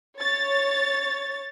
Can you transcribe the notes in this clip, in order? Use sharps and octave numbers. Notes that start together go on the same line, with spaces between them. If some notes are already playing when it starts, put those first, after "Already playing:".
C#5 A6